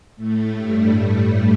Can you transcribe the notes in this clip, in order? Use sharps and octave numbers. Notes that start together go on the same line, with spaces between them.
A2 A3
G2 G3